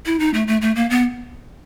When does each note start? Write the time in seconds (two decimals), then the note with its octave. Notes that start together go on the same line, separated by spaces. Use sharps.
0.06 E4
0.20 D#4
0.34 A3
0.48 A3
0.61 A3
0.76 A#3
0.90 B3